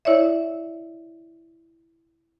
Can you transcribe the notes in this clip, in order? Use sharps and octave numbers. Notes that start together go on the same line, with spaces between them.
E4 C#5 D5 E5